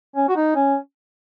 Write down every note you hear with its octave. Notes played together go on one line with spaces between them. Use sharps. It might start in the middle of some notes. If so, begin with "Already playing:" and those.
C#4
F#4
D#4
C#4